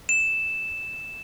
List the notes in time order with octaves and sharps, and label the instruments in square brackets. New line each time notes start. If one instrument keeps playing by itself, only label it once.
[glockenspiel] E7